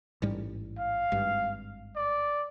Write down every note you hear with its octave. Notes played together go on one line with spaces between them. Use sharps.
A1 G#2 G3
F5
G#1 G2
D5